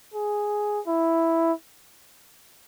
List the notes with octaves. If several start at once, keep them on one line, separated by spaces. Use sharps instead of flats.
G#4
E4